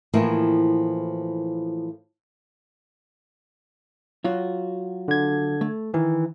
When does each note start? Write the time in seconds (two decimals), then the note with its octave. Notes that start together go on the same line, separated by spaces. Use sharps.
0.13 A2 E3 F3 A#3 E4
4.24 F#3 F4 F#4
5.08 D3 G#6
5.61 A3
5.94 D#3 E3